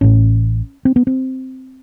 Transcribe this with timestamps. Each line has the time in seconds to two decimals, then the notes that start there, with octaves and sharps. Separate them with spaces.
0.01 A1 A2 C#4
0.85 C4
0.96 B3
1.07 C4